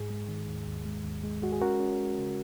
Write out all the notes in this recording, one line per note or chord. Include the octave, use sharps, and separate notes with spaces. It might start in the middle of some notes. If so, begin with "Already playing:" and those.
Already playing: G#2 G#4
G#3
D#3
D#2
D#2
G#3
D#2
G#3
G#3 F#4
G#4
C#4 F#4 A#4
C#4
G#3
C#3